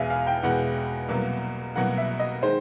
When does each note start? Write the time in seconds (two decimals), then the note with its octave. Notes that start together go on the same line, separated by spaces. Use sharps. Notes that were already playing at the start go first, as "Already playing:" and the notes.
Already playing: E2 B2 G#3 E5 F5 G#5
0.10 F5
0.27 G5
0.43 E2 B2 G#3 F#5
1.09 C2 B2 F#3 A#3
1.75 C2 B2 F#3 A#3 F#5
1.97 E5
2.19 D#5
2.43 D#3 G#3 C5